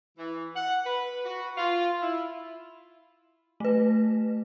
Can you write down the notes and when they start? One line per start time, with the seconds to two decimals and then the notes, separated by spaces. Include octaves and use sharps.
0.17 E3
0.56 F#5
0.86 B4
1.24 F#4
1.56 F4
2.02 E4
3.60 A3 B4